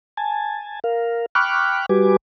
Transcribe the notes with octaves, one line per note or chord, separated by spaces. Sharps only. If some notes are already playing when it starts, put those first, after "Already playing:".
G#5 A5
A#4 F5
G5 B5 C#6 D6 F6 F#6
G3 F#4 G4 B4 G#5 D6